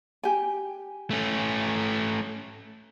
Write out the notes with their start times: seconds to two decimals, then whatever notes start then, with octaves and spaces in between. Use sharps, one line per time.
0.23 G4 G#5
1.11 A3 C#4